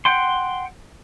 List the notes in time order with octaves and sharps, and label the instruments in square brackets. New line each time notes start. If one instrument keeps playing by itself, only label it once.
[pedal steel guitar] F#5 G5 C6